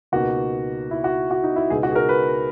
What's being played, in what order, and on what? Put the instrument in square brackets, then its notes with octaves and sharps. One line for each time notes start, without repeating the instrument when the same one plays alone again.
[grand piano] C#2 B2 A#3 D#4 F#4
E4
F#4
F#4
D#4
E4
C#2 B2 G#3 D#4 G#4
F#4
G#4
A#4
B4